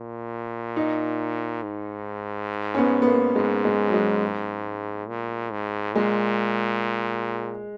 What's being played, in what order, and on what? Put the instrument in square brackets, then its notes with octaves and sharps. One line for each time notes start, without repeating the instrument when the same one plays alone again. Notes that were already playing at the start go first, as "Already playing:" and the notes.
Already playing: [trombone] A#2
[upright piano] D#4
[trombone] G#2
[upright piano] C#4
B3
B3
A#3
[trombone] G#2 [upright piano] G#3
[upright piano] G#3
F#3
G#3
[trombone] A#2
G#2
[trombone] A#2 [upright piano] G#3